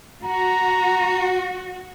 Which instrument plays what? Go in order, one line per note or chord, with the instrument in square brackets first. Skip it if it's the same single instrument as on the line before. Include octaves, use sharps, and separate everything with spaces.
[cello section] F#4 [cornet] A#5